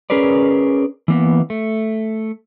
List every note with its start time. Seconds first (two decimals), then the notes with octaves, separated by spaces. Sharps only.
0.10 C#4 G#4 A#4 B4 D5
1.08 E3 A#3 B3
1.50 A3